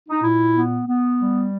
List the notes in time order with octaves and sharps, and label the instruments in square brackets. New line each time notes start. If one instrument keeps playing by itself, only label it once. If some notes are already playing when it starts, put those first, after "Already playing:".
[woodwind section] D#4
A#2 E4
B3
B3
G3